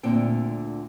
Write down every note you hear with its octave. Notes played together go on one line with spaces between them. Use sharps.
D2 A#2 D3 C4 G5